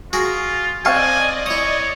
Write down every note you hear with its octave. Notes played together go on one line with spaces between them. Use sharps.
F4 F#4 G#4 A#4
C4 A4 D5 D#5 F5 G#5 C#6
E4 C#5 D#6